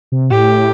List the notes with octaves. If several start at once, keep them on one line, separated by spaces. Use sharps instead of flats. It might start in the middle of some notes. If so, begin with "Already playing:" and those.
C3
A2 G4